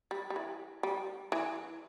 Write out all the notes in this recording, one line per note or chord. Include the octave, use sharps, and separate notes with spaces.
G3
G3
E3
G3
E3